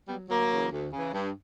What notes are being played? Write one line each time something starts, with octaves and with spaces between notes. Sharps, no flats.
F#3 G3 B3
D2 F#3 A#3
C#3 E3
D2
C#3 E3
G2